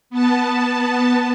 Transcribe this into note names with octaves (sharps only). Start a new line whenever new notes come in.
B3 A5